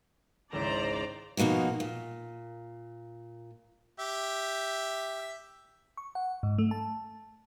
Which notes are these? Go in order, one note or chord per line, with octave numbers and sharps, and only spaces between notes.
G#1 C#2 E4 C5 D5 A#5
F2 B2 A#3 D#4 F#4
A#2
G4 E5
C#6
F#5
G#2
A3
A5